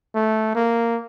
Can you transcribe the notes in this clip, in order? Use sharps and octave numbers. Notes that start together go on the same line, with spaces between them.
A3
A#3